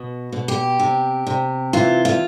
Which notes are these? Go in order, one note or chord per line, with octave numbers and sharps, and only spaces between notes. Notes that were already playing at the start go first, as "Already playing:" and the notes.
Already playing: B2
B2
G4
C3
C3
E3 F4
F4